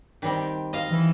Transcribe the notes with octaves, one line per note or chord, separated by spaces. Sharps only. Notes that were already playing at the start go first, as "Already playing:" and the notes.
D#3 G3 C4
D#5 F5
E3